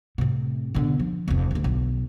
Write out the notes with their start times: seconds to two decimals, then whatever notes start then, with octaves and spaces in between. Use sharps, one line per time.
0.18 A2 C3
0.74 B2 D3
1.00 F3
1.28 F1 F2
1.51 D2 A3
1.64 B1